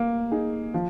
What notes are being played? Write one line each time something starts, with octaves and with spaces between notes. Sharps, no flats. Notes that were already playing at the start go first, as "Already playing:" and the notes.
Already playing: A#3
D#4 G#4
F3